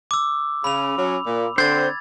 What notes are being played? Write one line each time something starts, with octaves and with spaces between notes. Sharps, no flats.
D6 E6
C#3 B5 F7
F#3 C#4
A#2
D3 C4 C5 G#6 A6